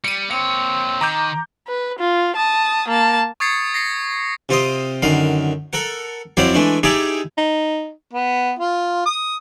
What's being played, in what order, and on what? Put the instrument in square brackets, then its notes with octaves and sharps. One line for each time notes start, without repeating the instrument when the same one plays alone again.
[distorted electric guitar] G3 [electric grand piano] C#7 D#7
[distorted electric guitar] A#3 C#5 [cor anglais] C4 [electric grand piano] C#7
[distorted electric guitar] D#3 [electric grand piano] A#5 D6 G6
[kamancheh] B4
F4
A5 D#6
A#3 A5
[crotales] C#6 D#6 G#6 A6 C7 C#7
A#6 C7 C#7
[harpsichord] C3 F4 C5 D#5
F#2 D3 D#3 F5
A4 A#4 F#5
F2 F#3 E4 C5 D5 F5
E3 G#3 A3 D4
D#4 E4 G4 G#4 D5 E5
[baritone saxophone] D#4
[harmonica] B3
F4
D#6